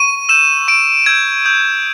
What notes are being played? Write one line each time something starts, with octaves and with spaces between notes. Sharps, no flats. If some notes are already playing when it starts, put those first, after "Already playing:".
Already playing: C#6 D#7
E6 G6 E7
C#6 D7
E6 G6 G#6
D#6 G6